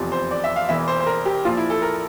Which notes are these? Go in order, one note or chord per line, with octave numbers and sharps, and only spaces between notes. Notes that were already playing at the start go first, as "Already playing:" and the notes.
Already playing: F1 E2 C3 F3
C5
D5
E5
F5
E1 E2 E3 E5
C5
C5
A#4
G4
A#1 A#2 F3 F4
E4
A4
A#4